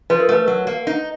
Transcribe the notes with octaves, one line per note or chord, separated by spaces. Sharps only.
F3 B4
A#4
A3 B4
F#3
A#3
D#4